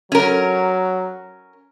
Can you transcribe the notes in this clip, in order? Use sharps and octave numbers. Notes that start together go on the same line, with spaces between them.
F#3 C#4 A#4